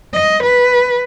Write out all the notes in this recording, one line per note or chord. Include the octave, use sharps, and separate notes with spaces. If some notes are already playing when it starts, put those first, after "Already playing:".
D#5
B4